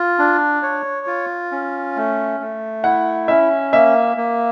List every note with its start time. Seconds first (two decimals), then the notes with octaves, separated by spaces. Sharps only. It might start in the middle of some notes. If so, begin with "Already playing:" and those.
Already playing: F4
0.19 D4
0.62 C#5
1.07 F4
1.52 C#4
1.96 A3
2.40 A3
2.84 E4 F#5
3.28 C#4 E5
3.73 A#3 E5
4.17 A#3